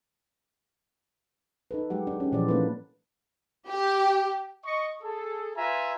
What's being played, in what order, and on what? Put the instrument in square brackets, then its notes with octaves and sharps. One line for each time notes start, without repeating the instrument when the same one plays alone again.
[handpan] D#4 A4 B4
F#3 G#3 G4 F#5
D4
C#4 G4
A#2 E3 F3 G#4 C5 D5
A3 A#3 C#4 D#4 F4 B4
[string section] G4
[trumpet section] D#5 C#6
G#4 A4
F4 B4 E5 G#5 A#5